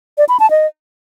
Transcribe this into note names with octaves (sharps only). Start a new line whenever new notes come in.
D5
B5
A5
D#5